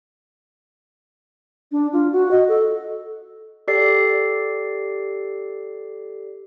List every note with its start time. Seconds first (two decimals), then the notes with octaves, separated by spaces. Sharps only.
1.72 D4
1.93 F4
2.12 F#4
2.31 D#5
2.48 A4
3.68 G4 A4 D5 C7